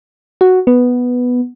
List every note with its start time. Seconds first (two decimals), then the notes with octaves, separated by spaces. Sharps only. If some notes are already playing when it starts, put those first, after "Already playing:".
0.41 F#4
0.67 B3